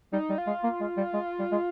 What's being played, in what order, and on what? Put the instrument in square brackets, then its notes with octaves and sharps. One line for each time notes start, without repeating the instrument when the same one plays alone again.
[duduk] G3 [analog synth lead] D#4
[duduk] G3
[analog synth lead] F4
[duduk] G#3
A#3
G#3
G3
G#3
G3
G#3